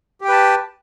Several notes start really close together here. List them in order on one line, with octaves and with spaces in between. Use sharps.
G4 G5 B4 A5